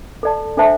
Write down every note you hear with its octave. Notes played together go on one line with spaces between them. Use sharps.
A4 D5 A5
D4 A4 C5 E5 A5